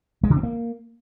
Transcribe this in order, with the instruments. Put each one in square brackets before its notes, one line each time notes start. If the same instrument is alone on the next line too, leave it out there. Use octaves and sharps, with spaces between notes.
[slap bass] G#3
D3
C4
A#3